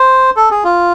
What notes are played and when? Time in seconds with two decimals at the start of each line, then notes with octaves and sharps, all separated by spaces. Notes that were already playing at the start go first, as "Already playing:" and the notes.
Already playing: C5
0.36 A4
0.51 G#4
0.64 F4